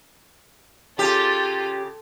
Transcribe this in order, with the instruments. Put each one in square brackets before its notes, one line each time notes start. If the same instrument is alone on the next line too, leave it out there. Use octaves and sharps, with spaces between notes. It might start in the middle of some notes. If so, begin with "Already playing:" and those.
[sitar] C#3 G4 [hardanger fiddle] F4 A4